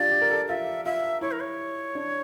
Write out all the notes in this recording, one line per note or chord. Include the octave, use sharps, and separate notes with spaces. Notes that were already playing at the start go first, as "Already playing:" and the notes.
Already playing: D4 F4 G4 D5
G4
A#4
A4
F4 E5
F4 E5
E4 C#5
A#4
C#5
D4